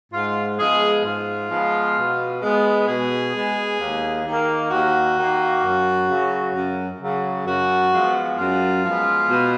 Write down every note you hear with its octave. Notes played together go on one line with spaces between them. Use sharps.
G#2 F4
F3 G#3 B3 G#4
G#2 F4
F3 G#3 B3
B2
G#3 B3
B2 G#4
G#3 B3
D#2
D#3 A#3
D#2 F#4
D#3 A#3
F#2
C#3 F#3
F#2
C#3 F#3
F#2 F#4
F3 G#3 B3
F#2 F4
F3 G#3 B3
B2